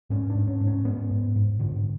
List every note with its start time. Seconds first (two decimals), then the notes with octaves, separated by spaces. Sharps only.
0.10 G#2 C#4
0.30 D4
0.35 G#2
0.47 C#4
0.61 G#2
0.67 C#4
0.85 G#2 B3
1.11 G#2
1.36 G#2
1.59 G#2 D3